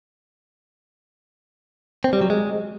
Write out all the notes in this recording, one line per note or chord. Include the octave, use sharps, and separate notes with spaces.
C4
G3
F#3
G#3